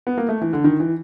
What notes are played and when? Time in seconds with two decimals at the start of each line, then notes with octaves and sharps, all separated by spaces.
0.07 B3
0.18 A#3
0.29 A3
0.41 E3
0.53 D3
0.64 D#3
0.80 E3